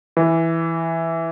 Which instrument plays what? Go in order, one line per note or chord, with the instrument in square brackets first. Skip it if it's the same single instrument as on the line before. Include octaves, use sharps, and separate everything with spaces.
[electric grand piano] E3